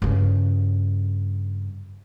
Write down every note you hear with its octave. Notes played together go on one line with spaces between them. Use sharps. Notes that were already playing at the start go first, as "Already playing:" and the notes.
G2 C#3